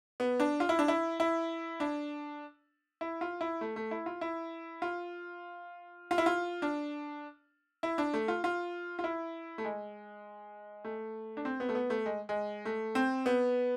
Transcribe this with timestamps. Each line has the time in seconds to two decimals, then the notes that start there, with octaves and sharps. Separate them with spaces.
0.20 B3
0.40 D4
0.60 F4
0.69 E4
0.79 D4
0.88 E4
1.20 E4
1.80 D4
3.01 E4
3.21 F4
3.41 E4
3.61 A3
3.76 A3
3.91 E4
4.06 F4
4.21 E4
4.82 F4
6.11 F4
6.18 E4
6.26 F4
6.62 D4
7.83 E4
7.98 D4
8.14 A3
8.28 F4
8.44 F4
8.99 F4
9.04 E4
9.58 A3
9.65 G#3
10.84 A3
11.37 D4
11.45 C4
11.60 B3
11.69 A3
11.75 B3
11.90 A3
12.06 G#3
12.29 G#3
12.65 A3
12.95 C4
13.26 B3